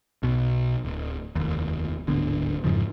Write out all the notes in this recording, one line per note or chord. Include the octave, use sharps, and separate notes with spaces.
B1 B2
D1
F1 D#2
D1 G#1 D3 B3
F2 G#2 C#3 F3